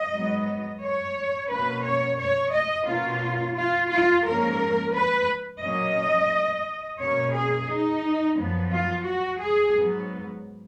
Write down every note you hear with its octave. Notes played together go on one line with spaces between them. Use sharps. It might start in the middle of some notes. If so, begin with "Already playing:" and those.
Already playing: D#5
G#2 F#3 B3
C#5
B2 A#3 C#4 B4
C#5
C#5
D#5
B2 A#3 C#4 F4
F4
F4
G#2 F3 A#3 C#4 A#4
B4
A#2 F#3 A#3 C#4 D#5
B2 A#3 C#4 C#5
G#4
D#4
F#2 F3 B3
F4
F#4
G#4
G#2 F#3 B3